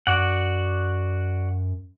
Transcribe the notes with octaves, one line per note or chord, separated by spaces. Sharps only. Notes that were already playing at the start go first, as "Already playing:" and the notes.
F#2 F#4 D5 F#5